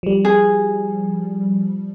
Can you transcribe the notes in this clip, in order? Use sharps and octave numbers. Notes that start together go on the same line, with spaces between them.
F3 G3
G#4